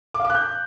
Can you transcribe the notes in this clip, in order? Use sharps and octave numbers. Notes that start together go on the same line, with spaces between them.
D6
F5
D6
F#6
G6